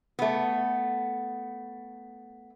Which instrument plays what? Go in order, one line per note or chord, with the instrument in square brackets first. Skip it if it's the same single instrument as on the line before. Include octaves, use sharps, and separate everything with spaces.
[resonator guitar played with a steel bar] A3 B3